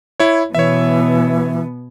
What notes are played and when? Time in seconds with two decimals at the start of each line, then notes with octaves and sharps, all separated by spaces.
0.20 E4 C#5
0.55 B2 E3 B3 C#5 E5